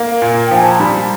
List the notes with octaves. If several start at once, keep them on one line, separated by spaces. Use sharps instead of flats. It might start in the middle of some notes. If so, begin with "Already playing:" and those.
Already playing: A#3 A#5
A#2
G5
F3 G#5
A5
A#5
G3 B5
B5